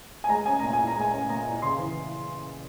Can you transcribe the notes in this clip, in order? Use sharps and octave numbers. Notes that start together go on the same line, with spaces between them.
G#5
G#3 A#5
C#4 G#5
A#2 A#5
G#5
E4
A#5
G#3 G#5
C#4
A#2 A#5
E4
C#3 C6
E3